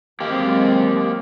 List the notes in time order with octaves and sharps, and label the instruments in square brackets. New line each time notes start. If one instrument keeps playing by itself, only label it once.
[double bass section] F#3 G#3 C4 [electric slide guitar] A#3 G4